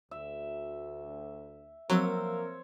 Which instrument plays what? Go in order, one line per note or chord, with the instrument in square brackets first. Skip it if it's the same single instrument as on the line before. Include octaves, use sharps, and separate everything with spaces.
[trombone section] D2 [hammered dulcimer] E5
[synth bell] F3 C4 E6 [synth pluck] F#3 [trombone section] A#3 A#4 [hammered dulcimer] C5 C#5